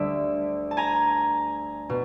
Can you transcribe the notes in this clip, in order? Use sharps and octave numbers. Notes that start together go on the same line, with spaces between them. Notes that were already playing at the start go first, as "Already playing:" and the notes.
Already playing: D2 D3 G3 D5 E5
A5
G#5 A#5
B2